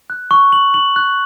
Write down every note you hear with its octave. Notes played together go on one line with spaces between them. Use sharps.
F#6
C#6
F#7
F#7
F#6